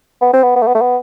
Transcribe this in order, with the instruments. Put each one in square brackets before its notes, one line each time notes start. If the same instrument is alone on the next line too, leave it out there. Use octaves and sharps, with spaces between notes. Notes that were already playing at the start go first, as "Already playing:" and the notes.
[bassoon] B3
C4
B3
B3
A3
B3
A3
B3